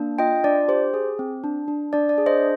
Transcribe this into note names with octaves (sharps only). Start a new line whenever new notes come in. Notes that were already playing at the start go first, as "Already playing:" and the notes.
Already playing: A#3 D4
F4 D#5 G5
D4 D5
G4 C5
G#4
C4
D4
D4
D4 D5
D5
G#4
C5 D#5